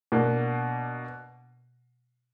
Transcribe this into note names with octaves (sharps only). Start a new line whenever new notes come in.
B2 A#3 D4